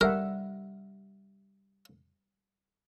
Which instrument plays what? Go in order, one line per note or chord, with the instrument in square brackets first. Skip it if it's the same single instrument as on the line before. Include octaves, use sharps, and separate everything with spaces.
[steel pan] G3 E5 F#5 [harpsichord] A#4